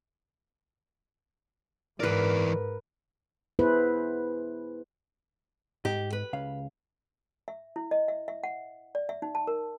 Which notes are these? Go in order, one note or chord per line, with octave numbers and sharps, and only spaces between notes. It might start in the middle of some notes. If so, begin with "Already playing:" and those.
G#2 E3 A#4 B4 D5
B3 E4 G#4 B4 C5
G#2 G4 D#5
B4
C#2 C#3 F5
E5
E4
D#5
E5
E5
F#5
D5
E5
D#4
A5
A#4